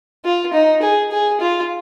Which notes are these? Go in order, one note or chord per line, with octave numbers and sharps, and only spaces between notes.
F4
D#4
G#4
G#4
F4